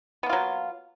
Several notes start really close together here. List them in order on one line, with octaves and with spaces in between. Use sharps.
B3 A#3 F4 F#3